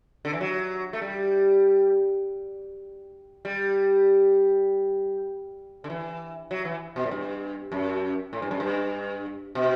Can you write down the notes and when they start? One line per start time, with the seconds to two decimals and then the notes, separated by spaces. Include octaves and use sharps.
0.25 D3
0.33 E3
0.41 F#3
0.93 A3
1.01 G3
3.45 G3
5.84 D3
5.90 E3
6.51 F#3
6.65 E3
6.96 B2
7.06 A2
7.11 G2
7.72 F#2
8.33 A2
8.42 G2
8.51 F#2
8.60 G2
9.55 B2